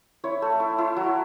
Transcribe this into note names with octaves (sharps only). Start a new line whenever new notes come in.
E4 C#5
A3
E4
E4
F#3